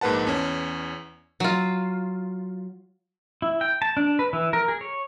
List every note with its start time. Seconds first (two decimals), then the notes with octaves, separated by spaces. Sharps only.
0.01 A#1 G#2 A#3 B4 F#5 A5
0.27 E2 C#4
1.40 F#3 F4
3.42 E4
3.61 G5
3.82 A5
3.97 D4
4.19 B4
4.33 E3
4.53 A#4
4.68 G#4
4.81 C#5